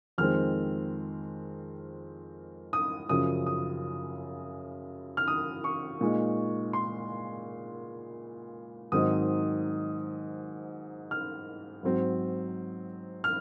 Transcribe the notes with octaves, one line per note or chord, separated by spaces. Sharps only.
F2 D#3 G#3 C4 F6
D#6
F#2 C#3 F3 D#6
D#6
F6
D#6
C#6
A#2 G#3 D#4
C6
G#2 D#3 F#3 C4 D#4 D#6
F6
G#2 F#3 C4
F6